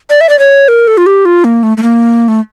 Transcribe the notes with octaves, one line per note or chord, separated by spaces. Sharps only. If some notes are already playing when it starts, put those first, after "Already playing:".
D5
E5
D5
C#5
A#4
A4
F4
G4
F4
A#3
A3
A3
A#3
A3